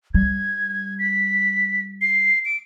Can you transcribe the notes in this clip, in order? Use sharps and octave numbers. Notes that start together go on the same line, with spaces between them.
G3 G#6
B6
C7
D7